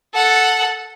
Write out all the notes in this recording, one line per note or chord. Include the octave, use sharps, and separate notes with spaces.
A4 F#5